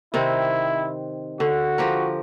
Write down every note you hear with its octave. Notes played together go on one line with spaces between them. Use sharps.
C3 D#3 C4 E4
D3 F#4
F3 G4 A#4